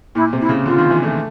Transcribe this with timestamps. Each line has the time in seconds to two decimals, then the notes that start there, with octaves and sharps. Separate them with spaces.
0.15 A#2 E4
0.33 C3
0.41 E4
0.49 C#3
0.66 D3 F4
0.78 D#3
0.90 E3
1.03 A3